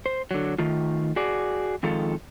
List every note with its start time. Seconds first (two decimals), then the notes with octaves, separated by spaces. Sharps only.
0.06 C5
0.31 D3 F#3
0.58 D#3 A3 F4
1.16 F#4 G#4 D5
1.83 F2 D#3 G#3 F4 A4